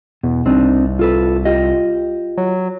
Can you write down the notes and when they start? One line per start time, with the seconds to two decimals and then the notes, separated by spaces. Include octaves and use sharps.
0.23 E2 B2
0.46 C2 C4 D4 D#4
0.99 F4 A4 B4
1.45 F4 G4 D#5
2.38 F#3